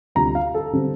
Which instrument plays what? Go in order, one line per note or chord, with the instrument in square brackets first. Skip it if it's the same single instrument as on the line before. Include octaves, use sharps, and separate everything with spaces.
[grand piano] D2 C3 G3 D4 F4 A#5
F5
A4
D3 G3 C4